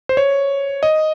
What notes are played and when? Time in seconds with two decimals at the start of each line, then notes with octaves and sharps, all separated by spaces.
0.09 C5
0.17 C#5
0.83 D#5